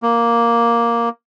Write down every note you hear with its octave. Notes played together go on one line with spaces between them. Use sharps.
A#3